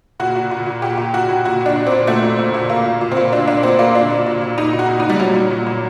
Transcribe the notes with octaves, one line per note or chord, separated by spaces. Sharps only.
A#2 F#4
A#2
A#2
A#2
A#2 G4
A#2
A#2 F#4
A#2
A#2 F#4
A#2
D4
A#2
C4
A#2
A#2 A3
A#2
A#2
A#2
A#2 A#3
A#2
A#2
C4
A#2
A#2 D4
A#2 D4
A#2 C4
A#2 A#3
A#2 D4
A#2
A#2
A#2
A#2 D#4
A#2
F#4
A#2
A#2 D#4
G3
A#2 F#3
A#2
A#2
A#2